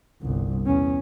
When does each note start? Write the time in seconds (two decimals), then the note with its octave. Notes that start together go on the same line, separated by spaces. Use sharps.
0.21 G1 C2
0.66 E2 C#4